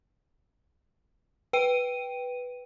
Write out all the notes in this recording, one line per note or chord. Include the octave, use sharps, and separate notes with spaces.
B4 G5 D#7